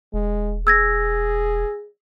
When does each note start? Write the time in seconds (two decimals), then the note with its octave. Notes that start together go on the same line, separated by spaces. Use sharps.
0.14 E1 G#3
0.67 G#4 E6 G#6 A#6